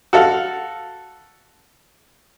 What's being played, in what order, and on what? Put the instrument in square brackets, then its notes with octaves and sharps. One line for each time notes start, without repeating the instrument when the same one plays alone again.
[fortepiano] F#4 A4 F5